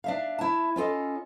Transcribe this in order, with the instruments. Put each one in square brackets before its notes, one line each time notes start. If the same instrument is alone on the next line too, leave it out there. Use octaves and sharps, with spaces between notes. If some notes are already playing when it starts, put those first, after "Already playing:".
[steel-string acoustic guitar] D4 E5 F5
E4 A5
C#4 F4 A4 D#5